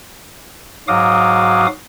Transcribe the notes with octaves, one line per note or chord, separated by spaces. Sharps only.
G#2 F#3 F#4 F5 D6 D#6